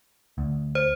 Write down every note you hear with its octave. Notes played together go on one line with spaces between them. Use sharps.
D2
C5